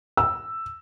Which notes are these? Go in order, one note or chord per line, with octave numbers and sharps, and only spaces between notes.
E6